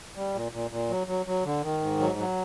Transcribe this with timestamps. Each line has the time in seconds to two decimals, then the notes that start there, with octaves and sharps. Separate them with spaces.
0.16 G3
0.34 A#2
0.52 A#2
0.71 A#2
0.89 F#3
1.07 F#3
1.26 F#3
1.44 D3
1.62 D#3
1.81 G#2
2.00 F#3
2.18 F#3